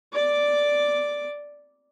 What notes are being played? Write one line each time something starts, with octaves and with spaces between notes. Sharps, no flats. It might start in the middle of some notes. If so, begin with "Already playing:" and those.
D5 D6